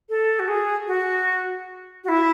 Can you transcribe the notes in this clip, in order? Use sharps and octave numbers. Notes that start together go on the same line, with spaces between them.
A4
F#4
G#4
F#4
F#4
E4